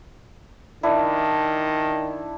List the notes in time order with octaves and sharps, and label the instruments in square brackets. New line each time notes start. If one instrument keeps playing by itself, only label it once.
[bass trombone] D#3 [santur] D4 E4